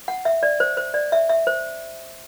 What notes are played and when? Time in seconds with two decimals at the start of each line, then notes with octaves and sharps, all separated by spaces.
0.08 F#5
0.25 E5
0.43 D5
0.60 C5
0.77 C5
0.94 D5
1.12 E5
1.29 E5
1.47 C5